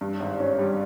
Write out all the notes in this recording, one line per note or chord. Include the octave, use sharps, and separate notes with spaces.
G2
G#1
C#4
G3